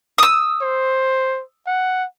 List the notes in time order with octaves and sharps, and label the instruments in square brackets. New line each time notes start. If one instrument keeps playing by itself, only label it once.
[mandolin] D#6 E6
[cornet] C5
F#5